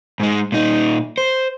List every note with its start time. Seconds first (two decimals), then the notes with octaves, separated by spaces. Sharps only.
0.20 G#2 G#3
0.52 A#2 D#4
1.18 C5